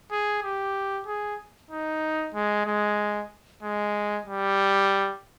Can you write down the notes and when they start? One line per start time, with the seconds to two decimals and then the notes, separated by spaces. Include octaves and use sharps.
0.11 G#4
0.43 G4
1.07 G#4
1.71 D#4
2.35 G#3
2.66 G#3
3.63 G#3
4.26 G3